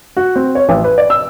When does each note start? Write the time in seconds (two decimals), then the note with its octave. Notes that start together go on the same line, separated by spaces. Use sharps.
0.17 F#4
0.36 C4
0.55 C#5
0.69 A1
0.84 B4
0.98 D5
1.10 E6